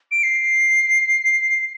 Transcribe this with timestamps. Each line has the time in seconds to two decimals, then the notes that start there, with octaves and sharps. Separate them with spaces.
0.11 D7
0.23 C7